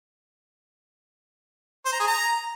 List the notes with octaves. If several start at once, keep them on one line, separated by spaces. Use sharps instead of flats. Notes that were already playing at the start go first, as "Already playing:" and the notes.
C5
A#5
G#4
A#5